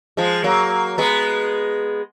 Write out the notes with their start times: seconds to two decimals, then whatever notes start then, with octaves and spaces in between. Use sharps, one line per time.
0.17 F3 G#3
0.44 F#3 A#3
0.98 G#3 B3